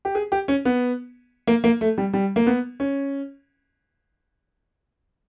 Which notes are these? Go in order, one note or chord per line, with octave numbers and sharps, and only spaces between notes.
G4
G#4
G4
C#4
B3
A#3
A#3
A3
G3
G3
A#3
B3
C#4